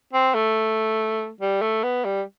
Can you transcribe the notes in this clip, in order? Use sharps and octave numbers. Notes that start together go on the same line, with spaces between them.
C4
A3
G3
A3
B3
G3